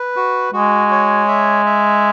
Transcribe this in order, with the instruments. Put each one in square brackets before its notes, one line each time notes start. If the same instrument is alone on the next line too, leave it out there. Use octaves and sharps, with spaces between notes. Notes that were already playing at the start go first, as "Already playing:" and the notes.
Already playing: [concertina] B4
F#4
[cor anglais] G#3 [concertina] F#4
[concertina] C#5
E5
E5